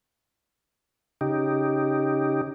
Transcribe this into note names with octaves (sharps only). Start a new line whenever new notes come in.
C#3 D#4 G4